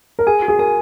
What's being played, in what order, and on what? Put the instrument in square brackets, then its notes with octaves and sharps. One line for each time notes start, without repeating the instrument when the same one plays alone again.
[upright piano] A#4
[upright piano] G#4 [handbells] G#5
[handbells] F#4
[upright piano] G#4
[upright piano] A#4 [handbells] G#5